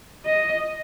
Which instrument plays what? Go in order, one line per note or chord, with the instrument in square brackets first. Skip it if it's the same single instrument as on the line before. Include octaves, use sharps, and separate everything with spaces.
[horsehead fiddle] D#5